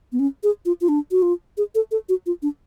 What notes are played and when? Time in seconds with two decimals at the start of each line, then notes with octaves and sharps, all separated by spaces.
0.12 B3
0.19 C#4
0.43 G#4
0.65 F4
0.81 F4
0.88 D4
1.11 F#4
1.22 F4
1.57 G#4
1.75 A4
1.91 A4
2.09 F#4
2.26 F4
2.42 D4